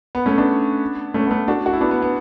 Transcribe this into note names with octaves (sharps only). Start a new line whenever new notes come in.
B3
A3 C#4
B3 D4
A3 C#4
B3
A3 C#4
D4 F#4
F#4
E4
B3 D4
B3
B3